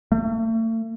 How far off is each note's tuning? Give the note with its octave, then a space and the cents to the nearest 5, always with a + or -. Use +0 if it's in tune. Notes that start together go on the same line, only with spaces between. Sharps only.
A3 +40